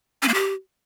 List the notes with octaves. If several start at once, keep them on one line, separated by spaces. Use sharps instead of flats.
C#4
A#3
G4